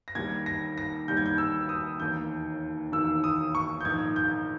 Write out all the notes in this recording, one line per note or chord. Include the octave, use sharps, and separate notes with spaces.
A#6
D#2 D#3 G3 G#6
A#6
A#6
D#2 D#3 G3 G6
G#6
G6
E6
D#6
E1 D#2 D#3 G6
E1 D#2 D#3 E6
D#6
C#6
G6
A#1 G#2 D#3 G#6
G6